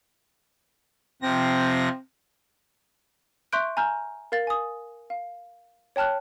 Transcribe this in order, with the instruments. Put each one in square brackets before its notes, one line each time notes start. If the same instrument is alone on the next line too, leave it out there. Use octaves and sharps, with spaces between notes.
[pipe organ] C3 F3 A#6 [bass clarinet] C4
[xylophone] E5 C6 C#6 F#6 G6 D7
G#5 A#5 F6 G6
A#4 F5 A6
G#5 D#6
F5
C#5 G5 A5 F6 F#6